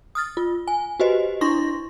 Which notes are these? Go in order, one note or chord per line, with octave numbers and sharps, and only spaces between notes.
D#6 F6 A6
F4
G#5
F#4 G4 B4 C5 D#5
D4 E4 C6 C#6 A#6